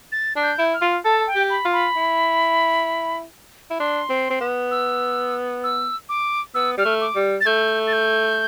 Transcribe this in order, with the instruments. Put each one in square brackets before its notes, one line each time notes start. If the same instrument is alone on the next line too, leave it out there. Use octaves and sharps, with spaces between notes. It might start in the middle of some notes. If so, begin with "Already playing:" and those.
[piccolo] A6
[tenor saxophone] D4
[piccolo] G6
[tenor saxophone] E4
[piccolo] F6
[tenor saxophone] F4
[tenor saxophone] A4 [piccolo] A5
[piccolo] G5
[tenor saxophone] G4
[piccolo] B5
[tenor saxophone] F4
[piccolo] B5
[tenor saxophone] E4
E4
[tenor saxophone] D4 [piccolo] C6
[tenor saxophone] C4
C4
B3
[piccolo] E6
E6
D6
[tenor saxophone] B3 [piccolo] E6
[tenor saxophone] G3 [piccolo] F6
[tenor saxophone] A3
[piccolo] D6
[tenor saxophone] G3
[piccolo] A6
[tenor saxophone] A3 [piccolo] G6
[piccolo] A6
G6